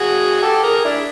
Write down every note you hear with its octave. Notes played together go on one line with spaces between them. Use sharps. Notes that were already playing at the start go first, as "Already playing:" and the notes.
Already playing: F#4 G#4
G4 A4
G#4 A#4
D4 E4